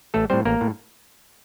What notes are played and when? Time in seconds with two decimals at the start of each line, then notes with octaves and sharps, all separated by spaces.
0.14 A1 A3 A4
0.30 A2 G3 C4 C5
0.45 A1 A#3 A#4
0.61 A2